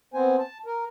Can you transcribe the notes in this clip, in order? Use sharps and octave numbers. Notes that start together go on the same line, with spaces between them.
B3 C4 C5 G#5
A5
A#4